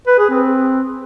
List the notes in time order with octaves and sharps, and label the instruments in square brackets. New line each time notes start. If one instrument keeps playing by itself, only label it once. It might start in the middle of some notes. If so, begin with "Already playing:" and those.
[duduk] B4
G#4
C4